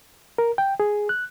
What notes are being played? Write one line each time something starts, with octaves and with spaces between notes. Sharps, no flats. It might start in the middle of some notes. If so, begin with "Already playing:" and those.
A#4
G5
G#4
F#6